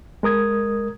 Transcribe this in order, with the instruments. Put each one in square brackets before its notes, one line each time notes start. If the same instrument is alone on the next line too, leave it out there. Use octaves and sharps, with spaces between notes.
[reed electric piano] G#3 A#4 D#6 G#6